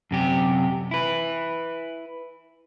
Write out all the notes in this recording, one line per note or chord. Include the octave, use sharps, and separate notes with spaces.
F#2 C3 G4
E4 B4